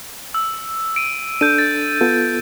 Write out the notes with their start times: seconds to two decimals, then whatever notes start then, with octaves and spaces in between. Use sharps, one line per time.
0.34 E6
0.96 D7 D#7
1.41 D4 A4 G6 D#7
1.58 A6
2.01 B3 F4 A4